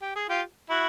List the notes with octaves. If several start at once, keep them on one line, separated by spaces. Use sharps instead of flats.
G4
G#4
F4 G4
E4 F#4